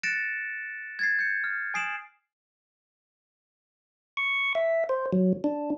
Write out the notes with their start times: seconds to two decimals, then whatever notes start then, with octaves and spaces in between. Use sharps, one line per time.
0.03 F#6 A6 A#6 C#7 D7 E7
0.99 G#6 A6 C7
1.19 G6 C#7
1.44 F6
1.74 G#5 D#6 C7 D7 E7 F#7
4.17 C#6
4.55 E5
4.89 C5
5.13 F#3
5.44 D4